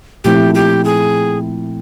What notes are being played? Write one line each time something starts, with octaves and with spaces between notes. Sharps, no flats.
A#2 F3 A3 C4 E4 G4
G4
G#4